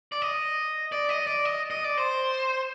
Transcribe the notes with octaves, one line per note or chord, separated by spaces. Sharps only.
D5
D#5
D5
D#5
D5
D#5
D#5
D5
C5